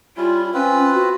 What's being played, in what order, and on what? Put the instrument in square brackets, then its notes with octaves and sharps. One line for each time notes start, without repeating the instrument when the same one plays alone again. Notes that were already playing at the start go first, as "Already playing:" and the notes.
[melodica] G3 C#4 E4 [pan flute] F4
[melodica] C4 F4 B4 [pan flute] C#4
[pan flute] F#4